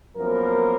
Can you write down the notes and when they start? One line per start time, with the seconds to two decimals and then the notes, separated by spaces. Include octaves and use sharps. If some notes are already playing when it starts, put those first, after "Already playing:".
0.16 F#2 F3 A#3 B3 A#4